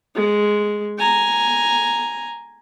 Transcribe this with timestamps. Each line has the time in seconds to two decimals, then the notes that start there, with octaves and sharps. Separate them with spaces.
0.15 G#3
0.98 G#5 A#5